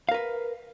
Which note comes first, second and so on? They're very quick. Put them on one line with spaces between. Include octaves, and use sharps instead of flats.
F5 A#4 B4